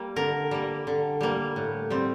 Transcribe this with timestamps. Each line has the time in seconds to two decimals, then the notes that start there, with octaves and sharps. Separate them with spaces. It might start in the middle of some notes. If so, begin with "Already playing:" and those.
Already playing: G3 A#3
0.16 D3 A#4
0.51 G3 A#3
0.87 D3
1.21 G3 A#3
1.56 A2
1.90 G3 C4